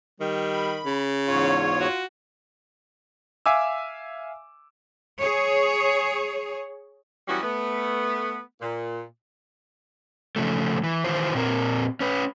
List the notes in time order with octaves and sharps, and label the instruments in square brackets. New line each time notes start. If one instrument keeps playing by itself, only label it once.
[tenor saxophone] D#3 [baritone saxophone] G3
[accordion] B5
[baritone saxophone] C#3
[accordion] E2 G#2 C#5 [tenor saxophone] F4
[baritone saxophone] F#4
[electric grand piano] E5 F5 G#5 D6 E6
[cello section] G#4 C#5
[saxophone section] E3 F#3 G3 B3 C#4 F#4
A3 B3
A#2
[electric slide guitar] C#3 F3 A3
E3
D#3 E3 E4 F4 C5
A#2 C4 A#4
C#4 B4